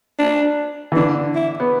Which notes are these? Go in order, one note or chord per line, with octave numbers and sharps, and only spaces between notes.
D4
E3
D3 D4
E4
B3